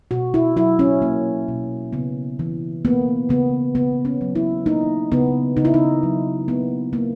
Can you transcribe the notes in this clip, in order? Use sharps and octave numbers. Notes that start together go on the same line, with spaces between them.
B2 F#4
E4
F#3 E4
C#4
A#3
B2
C#3 B3
E3
A#3 B3
C#3 B3
C#3 B3
C#4
F#3
E4
A#3 D#4
C#3 B3
C#3 D#4
E4
D#4
F#3
A#3 B3
C#3 A#3